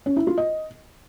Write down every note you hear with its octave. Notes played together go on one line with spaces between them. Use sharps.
C#4
E4
F4
D#5